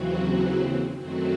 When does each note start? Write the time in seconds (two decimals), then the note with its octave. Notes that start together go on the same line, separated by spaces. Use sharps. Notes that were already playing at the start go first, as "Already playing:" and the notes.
Already playing: D#2 C#3 E3 F#3 C4 F#4
0.98 F#2 D#3 F#3 A3 C4 F#4